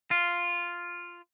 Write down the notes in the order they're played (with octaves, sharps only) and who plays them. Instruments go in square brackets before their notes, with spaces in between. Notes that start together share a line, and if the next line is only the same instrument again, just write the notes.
[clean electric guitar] F4